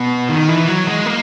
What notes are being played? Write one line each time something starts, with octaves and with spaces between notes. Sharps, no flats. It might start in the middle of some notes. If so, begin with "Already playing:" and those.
Already playing: B2
D#3
E3
F#3
G#3
A#3